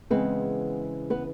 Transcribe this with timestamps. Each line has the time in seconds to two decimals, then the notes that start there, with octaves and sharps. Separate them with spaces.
0.10 C#3 E3 G#3 B3 C4 B4
1.10 B3 B4